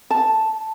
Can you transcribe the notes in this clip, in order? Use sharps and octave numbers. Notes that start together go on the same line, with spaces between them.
A5